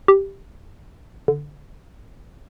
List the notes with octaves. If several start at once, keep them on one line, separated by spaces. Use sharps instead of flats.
G4
D3